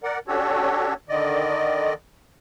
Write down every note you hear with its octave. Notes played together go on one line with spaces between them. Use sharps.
A#4 D5 F#5
C#4 D4 F#4 G4 A4 C#5
D3 D#3 D5 D#5